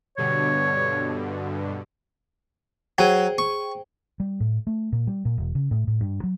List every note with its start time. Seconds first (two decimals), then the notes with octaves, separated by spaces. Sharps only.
0.18 G2 B2 D3 C#5
2.98 F#3 G#4 C5 G5
3.38 C#6
4.20 G3
4.40 A2
4.67 A3
4.92 A#2
5.07 G3
5.25 A#2
5.38 E1
5.55 C#3
5.71 A2
5.87 A2
6.01 G2
6.24 F#3